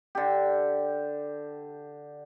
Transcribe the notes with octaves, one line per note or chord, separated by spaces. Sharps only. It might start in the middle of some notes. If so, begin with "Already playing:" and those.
D3 G4